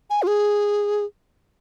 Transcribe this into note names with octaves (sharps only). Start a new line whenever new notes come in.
G#5
F4
G#4